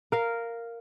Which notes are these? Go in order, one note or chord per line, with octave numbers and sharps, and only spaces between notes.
A#4 F5